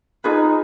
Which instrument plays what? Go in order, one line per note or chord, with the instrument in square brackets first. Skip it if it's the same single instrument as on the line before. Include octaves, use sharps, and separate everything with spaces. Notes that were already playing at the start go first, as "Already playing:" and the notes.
[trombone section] D#4 [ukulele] F4 G#4 B4